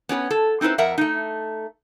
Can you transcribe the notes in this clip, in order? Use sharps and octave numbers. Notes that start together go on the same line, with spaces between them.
B3 C#4 G4 B4
A4
C4 D#4 E4 B4 C5
F2 A#4 E5 F#5 A#5
A3 D#4